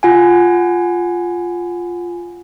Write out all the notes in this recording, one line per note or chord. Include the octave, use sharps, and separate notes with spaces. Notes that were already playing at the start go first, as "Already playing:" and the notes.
F4 F#5 G#5